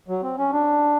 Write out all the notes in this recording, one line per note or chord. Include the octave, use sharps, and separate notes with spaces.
F#3
C4
C#4
D4